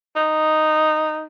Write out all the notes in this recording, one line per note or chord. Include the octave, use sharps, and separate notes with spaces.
D#4